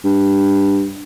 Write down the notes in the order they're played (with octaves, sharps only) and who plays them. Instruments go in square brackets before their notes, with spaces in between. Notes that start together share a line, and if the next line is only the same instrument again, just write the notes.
[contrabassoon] G2